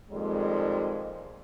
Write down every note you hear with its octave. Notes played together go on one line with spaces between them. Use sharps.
F2 A#2 D#3 G3 G#3